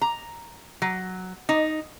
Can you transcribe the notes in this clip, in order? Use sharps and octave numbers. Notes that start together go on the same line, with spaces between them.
A#5
F#3
D#4